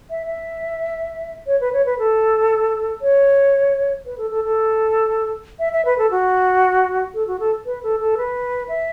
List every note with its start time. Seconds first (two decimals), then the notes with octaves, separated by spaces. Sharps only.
0.10 E5
0.27 E5
1.47 C#5
1.61 B4
1.73 C#5
1.86 B4
1.99 A4
3.02 C#5
4.06 B4
4.18 A4
4.31 A4
4.44 A4
5.59 E5
5.73 E5
5.85 B4
5.98 A4
6.11 F#4
7.14 A4
7.27 F#4
7.40 A4
7.66 B4
7.83 A4
8.00 A4
8.17 B4
8.69 E5